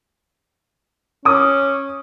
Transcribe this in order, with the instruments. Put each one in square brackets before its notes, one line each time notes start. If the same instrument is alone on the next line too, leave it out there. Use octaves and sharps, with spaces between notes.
[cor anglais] C#4 [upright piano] D6 D#6